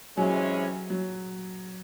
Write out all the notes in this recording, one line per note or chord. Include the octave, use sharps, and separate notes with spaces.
C3 E3 F#3 G#3 C#4
F#3